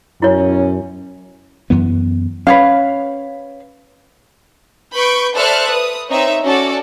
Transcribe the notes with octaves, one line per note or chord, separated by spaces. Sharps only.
F#2 B2 C#4 E4 C#5
F#2 E3 B3
C#4 B4 C#5 F5
B4 B5 C#6 G6 D7
A4 C5 D5 E5 F6 F#6
B4 D#6
C4 D#4 C#5 E5
C#4 F#4 A4 D5